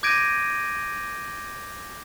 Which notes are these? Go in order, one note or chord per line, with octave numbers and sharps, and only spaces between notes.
D6 G6 G#6 A#6 D7 D#7